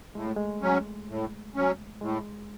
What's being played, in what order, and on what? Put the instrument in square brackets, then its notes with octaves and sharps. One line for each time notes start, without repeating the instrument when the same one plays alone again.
[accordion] A2 [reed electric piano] G#3
[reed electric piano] A3
G#3
[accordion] F#3 C#4
A2
F#3 C#4
[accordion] A2 [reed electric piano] G#3